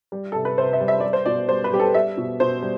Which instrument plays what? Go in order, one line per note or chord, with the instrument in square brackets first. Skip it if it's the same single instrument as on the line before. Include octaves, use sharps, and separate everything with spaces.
[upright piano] G3
C3 A4
B4
C3 C5
E5
G3
E5
G3 D5
C5
B2 D5
G3 C5
B4
G3 G4
A4
G3 E5
B2
B2 C5
G3